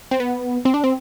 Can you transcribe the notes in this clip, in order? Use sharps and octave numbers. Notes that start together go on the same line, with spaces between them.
C4
B3
C4
D4
C4